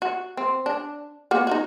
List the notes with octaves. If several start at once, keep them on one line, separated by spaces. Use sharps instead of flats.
F#4
C4
D4
A#3 B3 F#4
D#4 E4 F#4